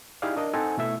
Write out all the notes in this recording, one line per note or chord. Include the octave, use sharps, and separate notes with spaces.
D#4 E4 G4 G#4 D5 F5
D4 A#4 D#5
C4 D#4 A4 C5 F#5 G#5
B2 A3 E4 E5